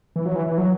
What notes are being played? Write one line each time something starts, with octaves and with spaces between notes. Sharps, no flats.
E3
F#3
E3
E3
F#3